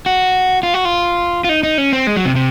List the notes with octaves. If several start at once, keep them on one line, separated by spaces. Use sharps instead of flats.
F#4
F4
F#4
F4
F4
D#4
D#4
C#4
C4
G#3
F#3
C3
C3